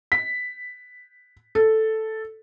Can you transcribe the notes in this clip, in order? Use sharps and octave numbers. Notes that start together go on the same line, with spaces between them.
B6
A4